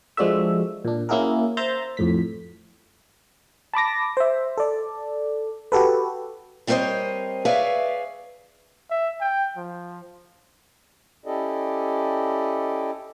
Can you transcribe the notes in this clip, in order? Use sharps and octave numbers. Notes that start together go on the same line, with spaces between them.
F3 G#3 D4 F#4 A4 E5
A#2 D4
A#3 C#4 E4 F#4 G#4 A#4
C5 E5 A#5 G6 A6
F2 A2 B6
A5 B5 D6 A#6
C5 E5
A4 D5
F#4 G4 A4 B4
G3 C4 A#4 C5 C#5 D#5
G#4 B4 C#5 D5 E5 F5
E5
G5
F3
C#4 E4 G4 A4 D5 D#5